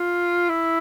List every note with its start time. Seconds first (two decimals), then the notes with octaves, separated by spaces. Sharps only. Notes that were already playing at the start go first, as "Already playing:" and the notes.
Already playing: F4
0.49 E4